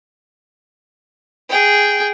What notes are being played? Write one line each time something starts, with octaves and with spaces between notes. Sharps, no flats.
G#4 G5